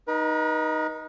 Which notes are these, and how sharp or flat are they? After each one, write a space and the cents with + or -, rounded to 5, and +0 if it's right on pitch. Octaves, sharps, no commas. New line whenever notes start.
D#4 +0 B4 -45